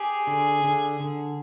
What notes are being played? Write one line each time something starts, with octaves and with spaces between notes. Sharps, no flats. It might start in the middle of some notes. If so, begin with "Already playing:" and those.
Already playing: G4 G#4
D3
D3
D3